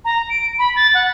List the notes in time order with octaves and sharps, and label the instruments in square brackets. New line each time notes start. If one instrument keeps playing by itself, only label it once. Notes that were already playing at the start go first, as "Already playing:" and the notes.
[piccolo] A#5
D7
B5
A6
F#5